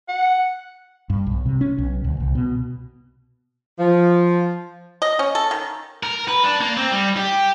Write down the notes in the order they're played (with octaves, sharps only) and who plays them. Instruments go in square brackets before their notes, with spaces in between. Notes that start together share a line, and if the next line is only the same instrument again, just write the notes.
[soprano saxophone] F#5
[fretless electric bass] G2
B1
C3
C#4
B1
D2
C2
B2
[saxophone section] F3
[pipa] D#5
C#4
A4
D#3
[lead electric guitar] A#4
B4
D4
A#3
C4
G3
G4